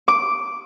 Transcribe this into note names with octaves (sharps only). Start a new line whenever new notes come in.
D6